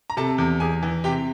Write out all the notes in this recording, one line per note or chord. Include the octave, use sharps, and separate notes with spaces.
A#5
C3 A4 A5
E2
E2 G#4 G#5
E3
C3 G4 G5